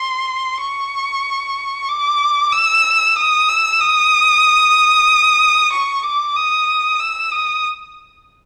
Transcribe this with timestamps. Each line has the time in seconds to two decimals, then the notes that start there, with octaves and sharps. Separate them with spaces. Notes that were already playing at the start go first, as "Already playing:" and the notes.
Already playing: C6
0.61 C#6
1.88 D6
2.52 E6
3.16 D#6
3.49 E6
3.81 D#6
5.72 C#6
6.03 D6
6.36 D#6
6.99 E6
7.31 D#6